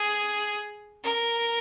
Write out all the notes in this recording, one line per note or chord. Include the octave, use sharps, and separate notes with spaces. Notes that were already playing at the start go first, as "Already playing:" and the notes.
Already playing: G#4
A#4